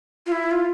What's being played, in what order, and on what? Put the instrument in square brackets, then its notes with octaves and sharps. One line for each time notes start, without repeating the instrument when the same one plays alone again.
[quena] F4
E4
F4